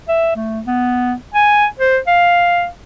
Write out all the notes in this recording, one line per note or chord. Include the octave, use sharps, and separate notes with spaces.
E5
A3
B3
G#5
C5
F5